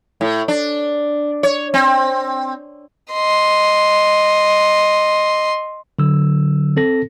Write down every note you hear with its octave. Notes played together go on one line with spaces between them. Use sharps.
A2
D4
C#5
C4
D#5 C6
D3 F#3 E6
C4 A4 A#6